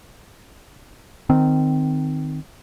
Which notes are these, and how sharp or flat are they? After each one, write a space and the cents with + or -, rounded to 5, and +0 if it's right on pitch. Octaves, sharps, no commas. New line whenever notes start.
D#3 -15 C4 -15